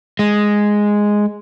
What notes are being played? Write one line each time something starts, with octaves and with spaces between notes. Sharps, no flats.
G#3